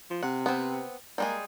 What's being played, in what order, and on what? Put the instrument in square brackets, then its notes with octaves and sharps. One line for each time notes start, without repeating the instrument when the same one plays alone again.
[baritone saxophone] F3
[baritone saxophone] C3 [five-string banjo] F#5
[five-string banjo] B3 C4
[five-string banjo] G3 G#3 G#4 [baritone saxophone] A#3